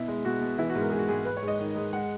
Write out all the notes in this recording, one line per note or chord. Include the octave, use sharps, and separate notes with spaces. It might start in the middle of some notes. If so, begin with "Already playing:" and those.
Already playing: B2 E4
G#3
B2 F#4
B2
E3 E4
F#4
G#2
A#4
G#2 G#4
F#4
G#2 G#4
G#2 B4
C#5
G#2
D#5
D#3
G#2
G#3 F#5